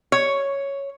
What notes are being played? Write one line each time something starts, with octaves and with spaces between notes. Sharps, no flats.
C#5